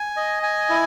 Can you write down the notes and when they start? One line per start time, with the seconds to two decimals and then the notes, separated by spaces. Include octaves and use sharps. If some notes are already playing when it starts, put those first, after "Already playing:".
Already playing: G#5
0.17 D#5
0.43 G#5
0.69 E4